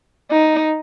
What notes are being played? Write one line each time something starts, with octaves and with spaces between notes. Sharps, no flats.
D#4